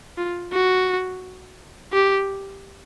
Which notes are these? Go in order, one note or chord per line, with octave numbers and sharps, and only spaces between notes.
F4
F#4
G4